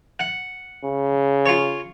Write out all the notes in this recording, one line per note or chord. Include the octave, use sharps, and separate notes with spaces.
F#5
C#3
F4 C#5